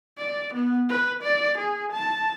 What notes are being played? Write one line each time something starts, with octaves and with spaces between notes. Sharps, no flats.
D5
B3
B4
D5
G#4
A5